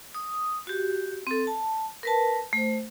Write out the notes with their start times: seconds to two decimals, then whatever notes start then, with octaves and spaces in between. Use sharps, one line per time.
0.15 D#6
0.67 F#4 G4
1.27 C4 A4
1.47 A5
2.03 A#4 B4 A5
2.53 A3 C5